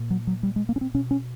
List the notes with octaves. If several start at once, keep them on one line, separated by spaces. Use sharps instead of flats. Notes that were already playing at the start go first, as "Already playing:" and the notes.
Already playing: A#2
F#3
F#3
G3
G#3
A#3
C#4
C4
B2 C#4
C#4